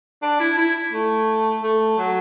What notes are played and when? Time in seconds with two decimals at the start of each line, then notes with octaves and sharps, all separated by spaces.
0.22 D4
0.40 E4
0.58 E4
0.93 A3
1.63 A3
1.98 F#3